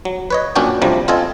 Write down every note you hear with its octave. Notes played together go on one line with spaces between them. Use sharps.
F#3
B4 C#5 D#5
F#2 A#2 C#4 D4 F#4 G5
D2 C3 F3 G3 A#5
C4 F4 A4 D#5 G#5